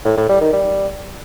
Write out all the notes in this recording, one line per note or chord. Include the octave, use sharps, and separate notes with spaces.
A2
A2
G3
D#3
G3